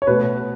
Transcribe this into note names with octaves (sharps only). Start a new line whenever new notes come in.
C#5
B2 A3 B4